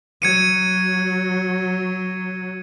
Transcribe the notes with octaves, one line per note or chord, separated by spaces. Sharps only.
F#3 G#6 C#7 D#7